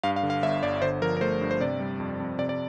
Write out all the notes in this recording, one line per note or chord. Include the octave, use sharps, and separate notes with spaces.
G2 F5
F5
D3
F5
G1 E5
G1 D5
D3 C5
F3 A#4
A#4
A3 C5
G2
C5
C3 D5
G3
F2
F2
C3 D5
D5